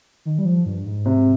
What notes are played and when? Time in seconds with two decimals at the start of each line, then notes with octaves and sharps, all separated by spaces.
0.25 D#3
0.39 G3
0.45 F3
0.66 G2
0.85 G#2
1.06 C3